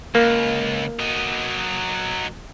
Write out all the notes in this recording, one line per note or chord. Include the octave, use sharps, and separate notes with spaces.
C#2 A#3
F#3 D#5